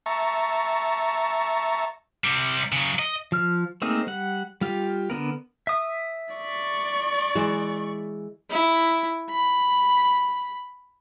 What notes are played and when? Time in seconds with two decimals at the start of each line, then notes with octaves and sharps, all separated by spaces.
0.06 E5 A5 A#5 C#6
2.24 C3 G3
2.72 C#3 F#3
2.99 D#5
3.32 F3 F6
3.82 A3 A#3 C4 D#4 G#4
4.07 G3 F#5
4.61 G3 F4 G4
5.10 D3 B3 A#4
5.67 E5 D#6
6.34 D5 C#6
7.35 E3 G#3
8.51 E4
9.30 B5